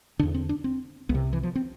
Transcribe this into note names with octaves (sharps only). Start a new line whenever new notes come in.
E2 D3 D4
C4
D4
C4
C2 B3
C3
E3
F3
C4